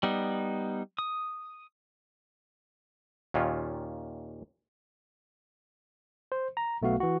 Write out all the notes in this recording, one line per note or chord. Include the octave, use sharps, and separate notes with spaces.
G3 B3 D#4
D#6
D#2 A#2 D#3 C#4 F4
C5
A#5
B1 A3 B3 F#4 F5
E3 F#4